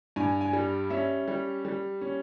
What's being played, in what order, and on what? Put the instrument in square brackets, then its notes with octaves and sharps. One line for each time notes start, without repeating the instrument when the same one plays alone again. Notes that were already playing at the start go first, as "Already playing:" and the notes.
[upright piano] G2 G#5
G#5
G3
C#4 E5
G3
G3
C#4